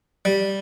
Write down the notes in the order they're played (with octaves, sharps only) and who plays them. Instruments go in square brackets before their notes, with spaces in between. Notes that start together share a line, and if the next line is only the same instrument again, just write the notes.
[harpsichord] G3